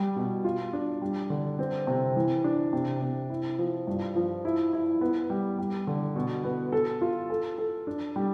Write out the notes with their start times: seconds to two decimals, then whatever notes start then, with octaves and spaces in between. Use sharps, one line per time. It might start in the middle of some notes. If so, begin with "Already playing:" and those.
Already playing: G3
0.16 B2
0.44 F4
0.73 D4
1.02 G3
1.30 D3
1.59 C4
1.87 C3
2.16 E3
2.44 D4
2.73 C3
3.01 C3
3.30 E4
3.59 F3
3.87 G2
4.16 F3
4.45 E4
4.73 E4
5.01 B3
5.30 G3
5.58 G3
5.87 D3
6.16 B2
6.44 B3
6.72 A4
7.01 F4
7.30 A4
7.58 A4
7.87 D4
8.16 G3